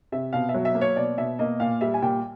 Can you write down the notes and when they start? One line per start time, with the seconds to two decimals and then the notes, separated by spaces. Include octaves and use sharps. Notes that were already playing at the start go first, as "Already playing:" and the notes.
0.12 C3 E5
0.33 B2 F5
0.49 E5
0.54 F#3
0.65 E5
0.75 A#3
0.81 C#5
0.96 B2 D5
1.18 B2 E5
1.39 A#3 D#5
1.60 A#2 F5
1.81 G3 E5
1.94 G#5
2.02 A#2 G5